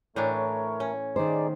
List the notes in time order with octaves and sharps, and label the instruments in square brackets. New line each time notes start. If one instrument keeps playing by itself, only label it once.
[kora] A2 E3 D4 [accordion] A3 A#4 C#5
[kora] C#4
[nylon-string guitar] D#3 C5 [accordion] D#4 G#4 D5